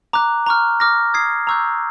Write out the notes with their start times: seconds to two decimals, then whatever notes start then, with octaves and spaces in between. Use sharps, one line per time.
0.13 A#5 D6 F#6
0.46 A#5 C#6 F6
0.80 D6 F6 A#6
1.14 D#6 G#6 C7
1.47 A#5 C#6 E6 G6